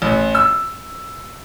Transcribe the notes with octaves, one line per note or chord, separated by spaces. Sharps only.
A1
E6